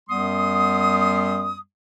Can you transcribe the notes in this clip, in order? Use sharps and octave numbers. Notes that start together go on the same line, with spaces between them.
F#2 G3 B3 C6 D#6